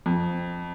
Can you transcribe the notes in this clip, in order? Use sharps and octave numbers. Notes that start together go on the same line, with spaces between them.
F2